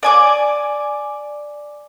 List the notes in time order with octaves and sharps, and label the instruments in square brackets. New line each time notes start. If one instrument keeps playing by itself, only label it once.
[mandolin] D5 G#5 D6